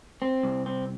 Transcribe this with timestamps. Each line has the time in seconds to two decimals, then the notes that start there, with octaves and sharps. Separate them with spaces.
0.22 C4
0.43 C2
0.66 C4